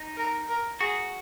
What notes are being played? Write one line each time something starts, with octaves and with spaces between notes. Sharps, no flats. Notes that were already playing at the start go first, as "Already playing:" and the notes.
Already playing: D#4
A#4
A#4
F#4 G#4